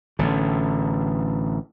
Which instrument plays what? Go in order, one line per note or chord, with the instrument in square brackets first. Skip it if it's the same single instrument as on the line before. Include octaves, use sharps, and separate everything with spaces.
[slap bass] A1 D3